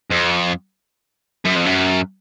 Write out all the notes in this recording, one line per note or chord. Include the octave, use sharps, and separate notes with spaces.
F2
F#2
F2
F#2